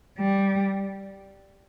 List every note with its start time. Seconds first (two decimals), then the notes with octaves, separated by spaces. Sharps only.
0.18 G3